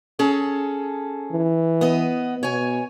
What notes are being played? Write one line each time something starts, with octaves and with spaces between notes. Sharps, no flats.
C#4 G#4 A4
E3
B3 D#5
B2 C#5 G#5